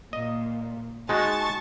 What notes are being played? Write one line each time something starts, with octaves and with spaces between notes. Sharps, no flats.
A#2 D#5
G#3 D#4 F#4 A5 C#6